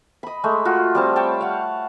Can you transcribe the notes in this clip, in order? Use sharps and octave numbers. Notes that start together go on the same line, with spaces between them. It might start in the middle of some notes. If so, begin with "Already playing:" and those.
D#5 B5
G#3 A3
F4 F#4
G3 C4 A5
C#5 F5 G5 A5
F5 F#5